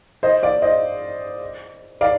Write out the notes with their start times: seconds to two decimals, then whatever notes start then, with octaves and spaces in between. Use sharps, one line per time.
0.23 C5 D#5
0.43 D5 F5
0.62 C5 D#5
2.01 D5 F5